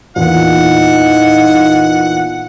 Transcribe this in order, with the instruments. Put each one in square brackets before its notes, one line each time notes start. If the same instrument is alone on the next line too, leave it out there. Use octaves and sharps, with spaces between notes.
[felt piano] E2 A#2 [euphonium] D#4 [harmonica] F#5